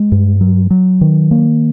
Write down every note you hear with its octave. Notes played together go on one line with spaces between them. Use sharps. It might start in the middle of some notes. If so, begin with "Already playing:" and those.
Already playing: G#3
G2
F#3
F#3
D#3
A#3